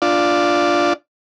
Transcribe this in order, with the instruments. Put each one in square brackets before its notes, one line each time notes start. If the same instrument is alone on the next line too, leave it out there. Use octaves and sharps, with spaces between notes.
[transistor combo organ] D4 F4 D5